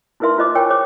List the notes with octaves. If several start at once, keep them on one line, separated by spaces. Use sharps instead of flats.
D#4 E4 A#4 B4 E5 C6
F4 C5 D#5 D6
A#4 C#5 G5 G#5 C#6 E6
G#4 C5 C#5 D6